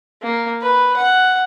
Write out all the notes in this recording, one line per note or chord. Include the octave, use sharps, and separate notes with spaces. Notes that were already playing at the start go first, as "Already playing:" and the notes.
A#3
B4
F#5